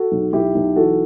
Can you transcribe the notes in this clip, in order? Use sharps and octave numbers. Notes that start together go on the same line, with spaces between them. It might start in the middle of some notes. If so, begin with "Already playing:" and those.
Already playing: F#4 A4
B1
B1 E4 G4
B1
E3 F#4 A4